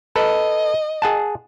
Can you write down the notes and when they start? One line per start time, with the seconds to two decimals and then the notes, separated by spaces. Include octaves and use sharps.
0.16 A4 B4 D#5
1.02 G#4 F#5 A5